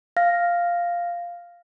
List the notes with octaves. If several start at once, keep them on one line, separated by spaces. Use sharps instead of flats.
F5 F6 A#6